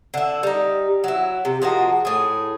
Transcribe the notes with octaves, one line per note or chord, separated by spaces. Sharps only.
D3 E4
G3 D#4
F#3 E4
C3
F3 G#3 A#3 F#4
A2 G#4